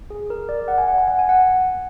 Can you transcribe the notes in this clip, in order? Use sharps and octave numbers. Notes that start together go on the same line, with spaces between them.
G#4
A#4
D5
F#5
G#5
F#5
G#5
F#5
G#5
F#5